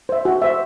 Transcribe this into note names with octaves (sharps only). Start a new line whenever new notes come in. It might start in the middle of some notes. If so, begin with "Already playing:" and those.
C5 E5
F#4
C5 E5